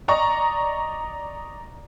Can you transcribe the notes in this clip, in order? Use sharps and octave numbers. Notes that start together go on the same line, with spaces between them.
D5 D#5 A#5 C#6